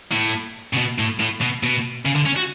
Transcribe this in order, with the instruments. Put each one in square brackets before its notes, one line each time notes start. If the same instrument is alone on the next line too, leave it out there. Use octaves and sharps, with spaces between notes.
[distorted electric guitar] A2
C#3
B2
A2
A2
B2
B2
C#3
D3
C#4
F#4